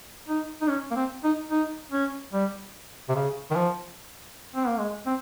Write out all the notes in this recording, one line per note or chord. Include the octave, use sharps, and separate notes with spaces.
D#4
D#4
C#4
A#3
C4
D#4
D#4
C#4
G3
C3
C#3
D#3
F3
C4
A#3
G#3
C4